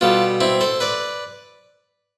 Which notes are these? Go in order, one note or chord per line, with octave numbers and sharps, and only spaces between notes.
B2 G3 F4 A4
C4 E4
A4 C5
B4 D5